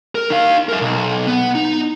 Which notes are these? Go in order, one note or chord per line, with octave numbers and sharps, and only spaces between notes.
A#4
D#4 F5
A#4 E5
B1
B3
D#4